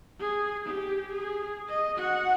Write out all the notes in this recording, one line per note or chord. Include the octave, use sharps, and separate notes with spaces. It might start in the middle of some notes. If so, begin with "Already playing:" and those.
G#4
G4
G#4
D#5
F#4 F#5